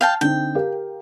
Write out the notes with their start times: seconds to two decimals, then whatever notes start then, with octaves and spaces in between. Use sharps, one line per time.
0.01 F5 G5 A5
0.21 D3 C4 D#4 G5
0.55 G4 A#4 F5